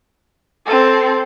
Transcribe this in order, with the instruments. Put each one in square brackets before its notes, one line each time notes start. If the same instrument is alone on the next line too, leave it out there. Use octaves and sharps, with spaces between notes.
[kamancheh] C4 A4